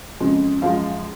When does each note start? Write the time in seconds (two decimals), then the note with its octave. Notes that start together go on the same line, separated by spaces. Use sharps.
0.20 F2 C#3 F3 G#3
0.62 F#2 F3 G#3 F5